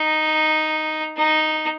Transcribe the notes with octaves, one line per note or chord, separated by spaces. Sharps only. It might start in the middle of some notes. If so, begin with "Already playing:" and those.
Already playing: D#4
D#4